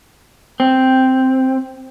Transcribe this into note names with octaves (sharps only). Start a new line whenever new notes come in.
C4